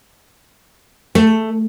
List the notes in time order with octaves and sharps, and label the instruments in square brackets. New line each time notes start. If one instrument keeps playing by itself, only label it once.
[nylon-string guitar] A3